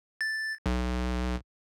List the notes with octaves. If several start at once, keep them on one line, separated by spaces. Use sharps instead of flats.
A6
B1